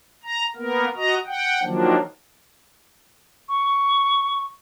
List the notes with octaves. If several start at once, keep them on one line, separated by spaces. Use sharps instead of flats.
A#5
A#3 B3 A#4
F#4 D#5 A#5
F#5 G5
D#3 F3 F#3 A#3 D4
C#6